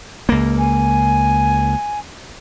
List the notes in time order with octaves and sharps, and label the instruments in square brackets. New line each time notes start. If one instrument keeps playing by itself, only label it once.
[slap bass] C#2 A#3
[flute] G#5